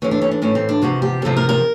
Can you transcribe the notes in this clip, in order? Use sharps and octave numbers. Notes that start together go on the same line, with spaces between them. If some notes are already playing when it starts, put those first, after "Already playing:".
A2 E3 C#4
D4
C#4
D4
A2 E3 C#4
C4
D4
E2 C3 F3 F#4
G4
E2 C3 F3 A4
A#4
A#4